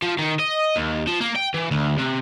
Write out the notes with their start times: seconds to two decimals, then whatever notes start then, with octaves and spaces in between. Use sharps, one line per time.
0.03 F3
0.19 D#3
0.39 D#5
0.76 D#2
1.07 F3
1.21 A#3
1.36 G5
1.54 E3
1.71 D2
1.98 C3